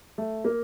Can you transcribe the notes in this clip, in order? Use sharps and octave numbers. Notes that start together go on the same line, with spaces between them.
A3
A#3